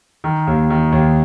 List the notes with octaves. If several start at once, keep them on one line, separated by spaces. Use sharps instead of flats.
D#3
D#2
D#3
D#2